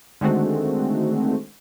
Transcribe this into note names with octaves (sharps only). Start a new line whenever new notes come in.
D3 D#3 G#3 A3 C4 F#4